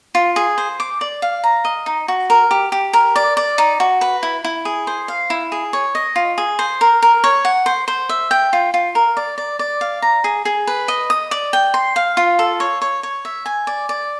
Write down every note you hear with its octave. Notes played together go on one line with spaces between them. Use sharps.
F4
G#4
C5
D6
D5
F5
A#5
D#5
D#4
F#4
A#4
G4
G4
A#4
D5
D5
D#4
F#4
B4
E4
E4
G#4
C5
F5
E4
G#4
C#5
D#5
F4
G#4
C5
A#4
A#4
C#5
F#5
C5
C5
E5
G5
F4
F4
A#4
D5
D5
D5
F5
A#5
G#4
G#4
B4
D#5
D#6
D5
G5
C6
F5
F4
A4
C#5
C#5
C#5
E5
G#5
D5
D5